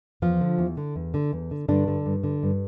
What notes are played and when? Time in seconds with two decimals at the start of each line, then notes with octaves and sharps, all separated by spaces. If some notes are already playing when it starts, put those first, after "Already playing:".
0.22 E2 F3 F4
0.41 D3
0.58 E2
0.77 D3
0.96 E2
1.14 D3
1.33 E2
1.51 D3
1.68 G2 D3 D4
1.88 D3
2.06 G2
2.24 D3
2.43 G2